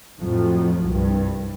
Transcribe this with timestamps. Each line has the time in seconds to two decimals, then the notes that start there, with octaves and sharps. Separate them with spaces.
0.19 F2 A2 F3 F#3
0.85 C2 G2